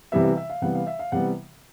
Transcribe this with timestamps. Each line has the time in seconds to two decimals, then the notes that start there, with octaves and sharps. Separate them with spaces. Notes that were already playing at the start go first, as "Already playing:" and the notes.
0.12 C3 E3 G3 B3 E5
0.24 E5
0.37 E5
0.50 F5
0.62 C3 E3 G3 B3 F#5
0.75 F5
0.87 E5
0.99 F5
1.12 C3 E3 G3 B3 F#5